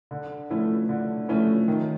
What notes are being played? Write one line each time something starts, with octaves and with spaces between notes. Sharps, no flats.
D3
F3 A3 C#4 E4
D3
F3 A3 C#4 E4
D#3